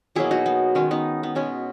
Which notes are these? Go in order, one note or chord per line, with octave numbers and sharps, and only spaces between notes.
B2 F#3 A#3 E4 G#4
D#4 F#4
B3
D#3 G#3 B3 C#4
B3 D#4
B3
B2 G#3 B3 C#4